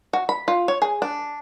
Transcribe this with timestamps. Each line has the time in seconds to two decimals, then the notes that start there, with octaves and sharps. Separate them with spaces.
0.13 F#4
0.29 B5
0.48 F4
0.68 C#5
0.82 G#4
1.02 D4